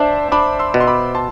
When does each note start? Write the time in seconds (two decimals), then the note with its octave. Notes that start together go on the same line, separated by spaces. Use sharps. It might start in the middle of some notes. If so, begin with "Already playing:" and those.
Already playing: D4 C5 D5 E5
0.32 D4 B5 D6
0.59 C6 E6
0.74 B2
0.80 C6
0.87 B5 D6
1.15 A5 C6